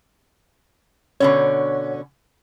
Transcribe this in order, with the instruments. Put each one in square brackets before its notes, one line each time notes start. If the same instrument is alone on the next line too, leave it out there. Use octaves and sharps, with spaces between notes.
[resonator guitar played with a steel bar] B2 D3 C#4 [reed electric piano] C#5